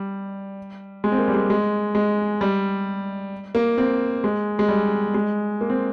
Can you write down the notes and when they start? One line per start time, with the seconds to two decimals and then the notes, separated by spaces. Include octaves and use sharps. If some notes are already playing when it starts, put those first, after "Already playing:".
Already playing: G3
1.04 G#3
1.12 C4
1.18 A#3
1.28 G3
1.34 G#3
1.50 G#3
1.95 G#3
2.41 G3
3.55 A#3
3.78 C4
4.24 G#3
4.59 G#3
4.69 G3
5.14 G#3
5.61 A#3
5.70 C4